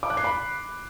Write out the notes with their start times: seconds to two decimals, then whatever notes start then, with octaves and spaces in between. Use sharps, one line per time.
0.03 D6
0.10 F#6
0.17 C7
0.24 B5